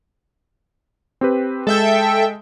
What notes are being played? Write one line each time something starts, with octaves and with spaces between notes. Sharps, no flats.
C4 G4 B4
G#3 A4 E5 G5